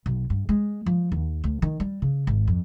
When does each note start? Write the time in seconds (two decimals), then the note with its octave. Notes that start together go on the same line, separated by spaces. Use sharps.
0.06 B1
0.30 G2
0.49 G#3
0.86 F3
1.12 D#2
1.44 D2
1.62 D#3
1.80 G3
2.02 C#3
2.27 G#1
2.47 F2